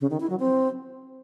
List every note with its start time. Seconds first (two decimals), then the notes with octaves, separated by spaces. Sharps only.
0.01 C#3
0.10 D#3
0.20 E4
0.30 F#3
0.39 C4